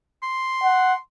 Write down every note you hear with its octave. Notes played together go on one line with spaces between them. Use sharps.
C6
F#5